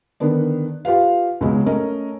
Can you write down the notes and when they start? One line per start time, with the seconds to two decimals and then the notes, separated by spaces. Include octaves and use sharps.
0.20 D3 D#3 B3 D4
0.85 F4 G4 B4 F5
1.41 C#2 B2 F#3 G#3
1.66 A3 C#4 A#4 D#5